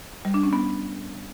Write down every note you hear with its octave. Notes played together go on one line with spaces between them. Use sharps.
G3
D4
C#4
B3